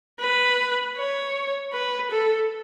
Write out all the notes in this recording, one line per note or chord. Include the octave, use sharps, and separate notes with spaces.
B4
C#5
B4
A4